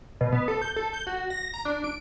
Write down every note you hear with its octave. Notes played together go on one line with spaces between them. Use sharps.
B2
B3
A4
G6
A4
G6
F#4
A#6
A#5
D4
D7